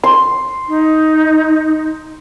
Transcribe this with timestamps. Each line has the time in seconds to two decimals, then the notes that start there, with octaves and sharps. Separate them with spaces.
0.04 C6
0.68 D#4